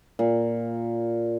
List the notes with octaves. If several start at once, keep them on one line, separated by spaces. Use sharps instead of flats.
A#2